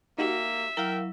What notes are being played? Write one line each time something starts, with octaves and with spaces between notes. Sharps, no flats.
A#3 D#4 F#4 G4 E5
F#3 E4 A#4 F5 G5